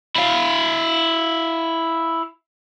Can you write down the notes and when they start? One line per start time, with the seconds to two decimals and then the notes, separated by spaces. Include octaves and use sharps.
0.16 E4 F5